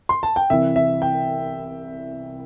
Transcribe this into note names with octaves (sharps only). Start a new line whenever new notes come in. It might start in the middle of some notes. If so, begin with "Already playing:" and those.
C6
A5
G5
C2 C3 E3 E5
E5
G5